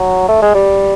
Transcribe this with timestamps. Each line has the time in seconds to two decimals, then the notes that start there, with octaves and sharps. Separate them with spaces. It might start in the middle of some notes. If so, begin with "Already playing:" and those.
Already playing: F#3
0.28 A3
0.42 G#3
0.55 G3